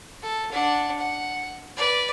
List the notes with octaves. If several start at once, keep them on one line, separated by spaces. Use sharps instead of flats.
A4
D4 F#5
F#5
B4 D5